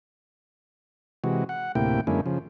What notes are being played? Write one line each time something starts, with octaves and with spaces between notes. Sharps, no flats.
C3 E3 G#3 F#4
F#5
D2 A2 C3 A#3 E4 G5
F#2 D3 G#3 A#3 C#4 E4
C#3 F3